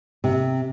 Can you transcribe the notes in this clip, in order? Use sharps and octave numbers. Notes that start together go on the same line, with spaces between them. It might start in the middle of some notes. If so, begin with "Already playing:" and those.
C3